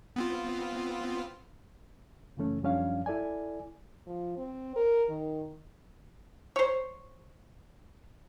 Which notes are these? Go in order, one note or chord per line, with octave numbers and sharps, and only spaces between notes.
B3 C4 F4
F#2 C#3 E3 A3 C#4
F#2 F3 G3 C#4 D4 F5
E4 A4 D5 G#5
F3
C4
A#4
D#3
C5 C#5